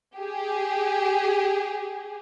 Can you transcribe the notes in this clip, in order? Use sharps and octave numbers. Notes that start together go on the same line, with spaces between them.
G4 G#4